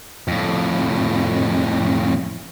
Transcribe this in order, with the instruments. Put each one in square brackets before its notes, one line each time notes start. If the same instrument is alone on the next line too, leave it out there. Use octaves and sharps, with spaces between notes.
[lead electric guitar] F2 A2